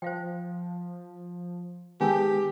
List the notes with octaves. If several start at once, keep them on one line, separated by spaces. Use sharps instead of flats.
F3 C5 F5 G5
D#3 G#3 B3 G4 G#5 A5 E6